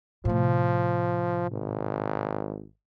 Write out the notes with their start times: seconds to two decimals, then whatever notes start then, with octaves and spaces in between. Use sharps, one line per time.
0.25 A2 C3 F3
1.51 G#1